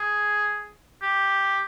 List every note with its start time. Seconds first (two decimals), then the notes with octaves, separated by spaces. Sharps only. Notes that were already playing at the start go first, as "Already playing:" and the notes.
Already playing: G#4
1.02 G4